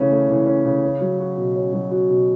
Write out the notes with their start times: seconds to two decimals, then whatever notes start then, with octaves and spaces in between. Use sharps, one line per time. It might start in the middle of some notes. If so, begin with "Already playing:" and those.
Already playing: C#3 E3 A3 C#4
0.11 A3
0.29 E3
0.46 C#4
0.65 C#3
0.83 C#4
1.01 F#3
1.19 F#4
1.37 B2
1.56 C#4
1.73 F#3
1.91 F#4
2.10 B2